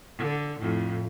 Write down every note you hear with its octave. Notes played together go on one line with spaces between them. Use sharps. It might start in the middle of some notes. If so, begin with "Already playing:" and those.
D3
F2 A2